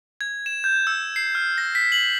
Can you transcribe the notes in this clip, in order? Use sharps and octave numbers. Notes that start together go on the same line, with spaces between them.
G#6
E7
G6
E6
C7
F6
A#6
B6
F#7